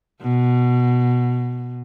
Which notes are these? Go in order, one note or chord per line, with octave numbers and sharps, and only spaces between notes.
B2